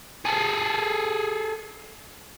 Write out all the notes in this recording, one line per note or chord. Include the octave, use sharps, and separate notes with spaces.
G#4 A4